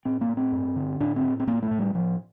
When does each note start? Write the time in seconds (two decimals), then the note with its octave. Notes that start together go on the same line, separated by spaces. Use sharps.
0.05 A2 C4
0.21 A#3
0.28 A2
0.37 C4
0.52 G2
0.76 D3
1.00 A2 D4
1.16 C4
1.24 A2
1.40 C4
1.47 A2 A#3
1.63 A3
1.71 A2
1.79 G3
1.94 A2 F3